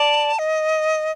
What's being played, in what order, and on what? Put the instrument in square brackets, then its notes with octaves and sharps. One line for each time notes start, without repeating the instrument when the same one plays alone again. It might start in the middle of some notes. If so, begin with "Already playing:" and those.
Already playing: [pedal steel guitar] D5 [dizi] A5
[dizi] D#5